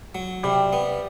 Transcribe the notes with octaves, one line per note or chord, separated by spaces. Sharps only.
F#3
C3 G3
B3